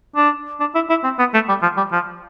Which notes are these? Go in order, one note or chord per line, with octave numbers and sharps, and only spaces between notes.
D4
D4
E4
E4
C4
B3
A3
G3
F3
G3
F3